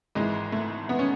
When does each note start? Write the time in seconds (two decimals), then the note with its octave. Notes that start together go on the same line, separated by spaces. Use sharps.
0.15 G#1 G#2 E3 G#3
0.52 A3
0.89 B3
0.99 C#4